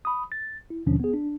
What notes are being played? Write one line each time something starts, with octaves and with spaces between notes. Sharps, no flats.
B5 D#6
A6
E4
D#2 B2 D3 F3 C#4 D4
B3 G#4
D4